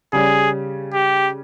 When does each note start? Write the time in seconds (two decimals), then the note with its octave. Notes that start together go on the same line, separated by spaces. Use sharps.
0.13 C#3 G3 C#4 G#4
0.94 G4